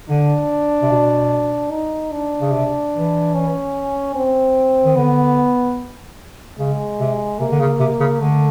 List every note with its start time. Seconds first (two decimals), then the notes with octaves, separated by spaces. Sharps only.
0.09 D3 D4
0.82 C3
0.91 B2
1.71 D#4
2.12 D4
2.40 C#3
2.52 C3
2.93 E3
3.33 C#4
4.15 C4
4.85 D#3
4.96 D3 B3
6.58 C#3 G#3
6.99 C3
7.39 C3 A#3
7.51 D3
7.60 C#3
7.79 C3
8.00 C#3
8.20 D3 A3